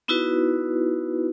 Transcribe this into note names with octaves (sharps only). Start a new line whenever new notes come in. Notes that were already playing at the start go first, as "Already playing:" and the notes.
B3 D#4 E4 F#4 B4